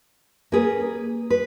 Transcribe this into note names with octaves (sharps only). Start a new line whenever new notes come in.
A#3 C#4 G#4 B4
B4